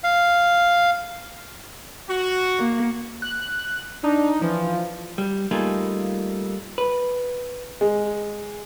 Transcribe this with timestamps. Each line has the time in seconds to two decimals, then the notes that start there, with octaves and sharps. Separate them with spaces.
0.04 F5
2.09 F#4
2.59 A#3
3.22 F#6
4.04 D4 D#4
4.42 E3 F3
5.18 G3
5.51 G3 A3 A#3 D#4 F4 G#4
6.78 B4
7.81 G#3